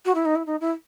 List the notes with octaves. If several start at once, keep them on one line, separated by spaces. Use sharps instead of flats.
F#4
E4
D#4
E4
D#4
E4